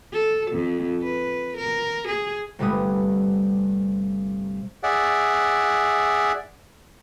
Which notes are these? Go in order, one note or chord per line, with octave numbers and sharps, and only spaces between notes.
A4
F2
B4
A#4
G#4
G1 C3 G3 A3 B3 D#6
G#4 D5 E5 F#5